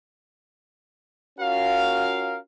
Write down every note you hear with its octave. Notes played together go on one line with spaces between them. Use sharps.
C#4 F4 F#4 A#4 F5